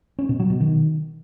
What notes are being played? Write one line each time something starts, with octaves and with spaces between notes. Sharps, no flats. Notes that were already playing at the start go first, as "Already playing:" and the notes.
C#4
B2
F#3
B2
D#3